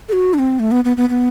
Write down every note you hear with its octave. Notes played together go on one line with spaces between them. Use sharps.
A4
F#4
D4
C4
A3
B3
B3
B3
B3